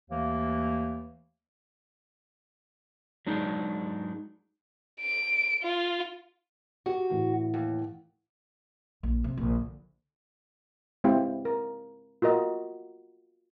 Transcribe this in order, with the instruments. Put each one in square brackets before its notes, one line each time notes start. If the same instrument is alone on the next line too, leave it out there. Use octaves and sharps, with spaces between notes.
[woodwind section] D#2 E3 A3 A#3
[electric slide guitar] F#3 G#3 D4 D#4 G#4
[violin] D7
F4
[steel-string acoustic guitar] F#4 [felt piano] G4
[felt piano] A2 E3 E4
[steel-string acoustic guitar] D#2
[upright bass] A#1
C3
A#1
D3
[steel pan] G#3 C4 E4 G4 F5 G5
A#4
F4 F#4 A#4 D#5